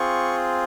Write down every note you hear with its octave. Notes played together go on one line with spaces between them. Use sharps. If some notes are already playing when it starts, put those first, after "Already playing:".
Already playing: C4 F4 G#4 C#6